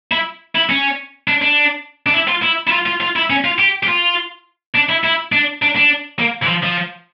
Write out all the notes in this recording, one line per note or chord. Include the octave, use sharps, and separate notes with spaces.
E4
E4
C#4
D4
D4
D4
E4
F4
E4
E4
F4
F4
F4
E4
C#4
F4
G4
G4
F4
D4
E4
E4
D4
D4
D4
A#3
E3
F3
F3